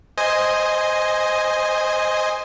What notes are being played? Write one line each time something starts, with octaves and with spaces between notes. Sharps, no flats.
C5 D#5 G#5